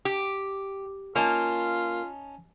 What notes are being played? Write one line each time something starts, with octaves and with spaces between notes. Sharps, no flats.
G4
A#3 C#4 D#4 F4 A5